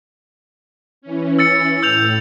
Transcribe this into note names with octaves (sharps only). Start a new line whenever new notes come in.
E3 C#4
E6 A6 C#7
A2 E6 G6 F7